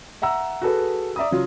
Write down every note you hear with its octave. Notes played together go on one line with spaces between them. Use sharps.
E5 F#5 A#5 E6
F#4 G#4 A4 B4
D5 E5 A#5 D#6
C#3 F#3 F4